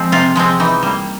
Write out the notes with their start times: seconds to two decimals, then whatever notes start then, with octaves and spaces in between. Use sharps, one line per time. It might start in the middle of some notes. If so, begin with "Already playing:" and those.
Already playing: F3 G#3 C4
0.12 C3 F4
0.36 F3 G#3 C4
0.60 E3 D#4
0.83 G3 A#3